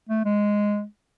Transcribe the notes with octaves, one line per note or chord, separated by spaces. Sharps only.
A3
G#3